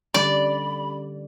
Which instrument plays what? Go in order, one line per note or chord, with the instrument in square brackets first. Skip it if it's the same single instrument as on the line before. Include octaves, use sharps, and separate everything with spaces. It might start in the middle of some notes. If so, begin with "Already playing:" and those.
[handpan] D3 G3 [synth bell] C#4 [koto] D5 [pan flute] B5